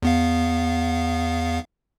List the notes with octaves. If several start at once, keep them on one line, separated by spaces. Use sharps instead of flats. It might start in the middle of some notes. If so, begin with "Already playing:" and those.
E2 B3 F5